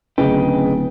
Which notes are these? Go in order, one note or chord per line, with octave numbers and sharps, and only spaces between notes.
D1 C#3 B4 D#5 G5